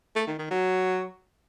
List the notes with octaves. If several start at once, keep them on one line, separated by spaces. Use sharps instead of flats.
A3
D#3
D#3
F#3